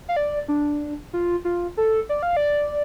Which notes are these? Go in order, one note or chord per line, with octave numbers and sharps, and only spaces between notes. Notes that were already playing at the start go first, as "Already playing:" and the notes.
F5
D5
D4
F4
F4
A4
D5
F5
D5